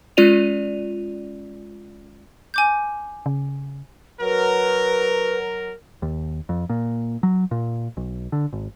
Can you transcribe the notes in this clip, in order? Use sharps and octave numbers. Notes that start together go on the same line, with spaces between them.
G#3 C#4 F4 D5 D#7 F7
G#5 D6 G6
C#3
F#3 A#4 B4
D#2
F2
A#2
F#3
A#2
B1
D3
G#1